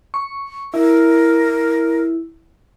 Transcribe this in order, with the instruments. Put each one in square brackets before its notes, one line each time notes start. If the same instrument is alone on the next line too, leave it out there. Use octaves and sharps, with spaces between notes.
[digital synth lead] C#6
[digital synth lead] E4 [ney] A#4